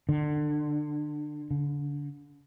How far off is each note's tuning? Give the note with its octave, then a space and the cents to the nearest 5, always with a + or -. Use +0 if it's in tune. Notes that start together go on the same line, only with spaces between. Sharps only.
D3 +25
D3 -30